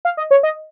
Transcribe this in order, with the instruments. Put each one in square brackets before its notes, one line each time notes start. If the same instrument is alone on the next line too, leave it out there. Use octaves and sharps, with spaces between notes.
[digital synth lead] F5
D#5
C#5
D#5